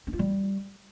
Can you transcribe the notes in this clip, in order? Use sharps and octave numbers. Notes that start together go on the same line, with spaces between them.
D4
F4
G3